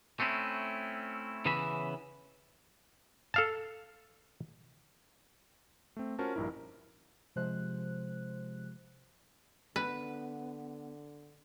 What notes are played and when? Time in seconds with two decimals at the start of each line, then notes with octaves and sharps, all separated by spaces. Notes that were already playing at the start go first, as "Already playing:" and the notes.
0.20 A3 C4 C#4 E4
1.45 C#3 E3 B3 C#4 E5 B5
3.34 A4 F5 A5
5.97 A3 C4
6.19 C#4 F4 F#4 A#4 C5 A5
6.35 A#1 G2 D#4 E4 A#4
7.36 C3 F3 G#3 C5 F#6
9.76 D3 B3 B4